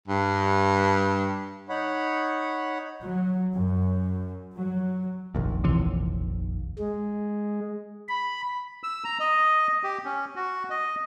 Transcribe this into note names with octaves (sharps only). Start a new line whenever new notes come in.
G2
D#4 C#5 F#5 B5
F#3
F#2
F#3
F1 A#1 D#2
C#2 C3 E3
G#3
B5
E6
A#5
D#5
G4
C#4
F#4
D#5